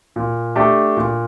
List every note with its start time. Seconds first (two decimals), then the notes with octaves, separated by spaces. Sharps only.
0.16 A#2
0.56 A3 D4 G4
0.97 A#2